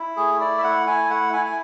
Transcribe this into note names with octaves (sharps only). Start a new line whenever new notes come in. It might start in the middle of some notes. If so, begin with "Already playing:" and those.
Already playing: E4
A3 G#4
E4 D5
E5
A3 F#5
E4 G#5
A3 F#5
E4 G#5
G#5